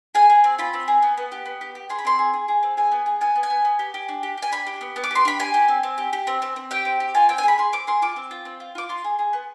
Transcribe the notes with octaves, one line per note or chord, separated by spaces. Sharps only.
G#4 G#5
G#4
C4
F4 B5
C4
G#4
B3
B3
G4
B3
G4
G4
G#4 C6
B5
C4 C6
G#4
G#4
G#4
C4
G#4 G#5
B3
G#4
B3 G#5
B3
G#5
B3
B3
G4
G4
D4
G4
G4 G#5
D4 B5
G4
B3
B3
D6
G4 C6
D4 B5
G4 G#5
G4
C4
C4
G4
G4
C4
C4
C4
G4 G5
C4
G4
F4 G#5
C4 G5
G#5
G#4 B5
G#4 C6
C4 D6
G#4 C6
F4 D6
C4
F4
C4
F4
F4 D6
F4 C6
G#4
G#4
B3